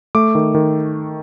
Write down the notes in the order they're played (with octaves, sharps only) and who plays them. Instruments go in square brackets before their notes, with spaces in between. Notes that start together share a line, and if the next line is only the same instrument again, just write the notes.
[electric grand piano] A3 D6
D#3
D#3